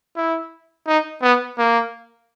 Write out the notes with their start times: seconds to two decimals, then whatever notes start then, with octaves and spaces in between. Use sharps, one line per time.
0.16 E4
0.88 D#4
1.22 B3
1.58 A#3